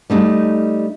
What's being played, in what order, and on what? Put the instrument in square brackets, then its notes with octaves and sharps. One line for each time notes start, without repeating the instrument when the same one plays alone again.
[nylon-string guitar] G3 A3 D#4